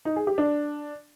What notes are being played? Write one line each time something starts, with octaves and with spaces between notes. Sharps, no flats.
D#4
G#4
G4
D4